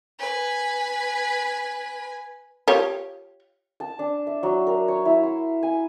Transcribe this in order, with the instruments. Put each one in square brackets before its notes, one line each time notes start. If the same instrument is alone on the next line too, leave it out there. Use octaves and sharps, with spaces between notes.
[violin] B4 G#5
[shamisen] F4 G4 C#5
[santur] A5
D4
E5
F#3
A#4
C#5
E4
C6
G#5